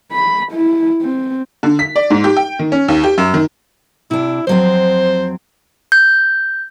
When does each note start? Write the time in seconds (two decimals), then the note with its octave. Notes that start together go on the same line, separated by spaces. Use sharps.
0.12 B5
0.52 E4
1.02 C4
1.63 D3
1.79 B6
1.96 D5
2.10 G#2
2.24 G4
2.36 G5
2.59 D#3
2.72 C#4
2.88 D#2
3.04 G4
3.18 F#2
3.34 D#3
4.11 C3 D4 E4
4.47 F2 F#3 C4 C5
5.92 G6